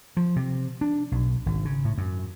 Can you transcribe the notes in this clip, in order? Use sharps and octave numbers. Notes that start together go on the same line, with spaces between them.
F3
C3
D4
B1
G#1
C#3
A2
F#2